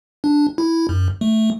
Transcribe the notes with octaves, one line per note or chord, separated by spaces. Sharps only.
D4
E4
F#2
A3